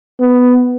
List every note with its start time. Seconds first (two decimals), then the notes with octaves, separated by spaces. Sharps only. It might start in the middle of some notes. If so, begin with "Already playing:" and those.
0.20 B3